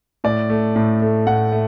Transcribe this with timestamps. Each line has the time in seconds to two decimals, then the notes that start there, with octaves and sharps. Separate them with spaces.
0.24 A2 D5
0.50 A3
0.76 A2
1.02 A3
1.27 A2 F#5
1.52 A3